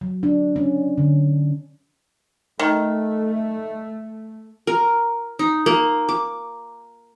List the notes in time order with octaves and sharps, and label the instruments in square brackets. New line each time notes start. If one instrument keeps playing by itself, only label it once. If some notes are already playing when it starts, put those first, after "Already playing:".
[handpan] F#3
D4
C#4
D3
[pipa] D#3 [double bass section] A3
[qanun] A#4
D#4
A#3
D6